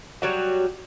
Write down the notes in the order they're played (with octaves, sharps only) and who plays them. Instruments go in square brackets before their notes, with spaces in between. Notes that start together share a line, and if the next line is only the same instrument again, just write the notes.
[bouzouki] F#3 G3 F#4